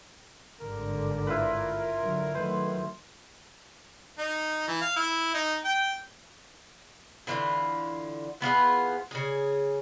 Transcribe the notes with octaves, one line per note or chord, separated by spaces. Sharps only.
G#1 G2 D3 A#4
E4 F4 B4
D3 F#3
D#3 F#3 A3 B4 C5
D#4
E3
F5
E4
D#4
G5
D3 E3 F4
E3 B3 F4 G#4
C#3 G#4